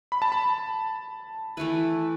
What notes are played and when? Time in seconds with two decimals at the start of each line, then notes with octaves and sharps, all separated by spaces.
0.12 B5
0.22 A5
0.32 B5
1.57 E3 A3 E4 B4